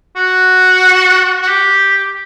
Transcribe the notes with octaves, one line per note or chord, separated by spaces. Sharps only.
F#4
F#4
G4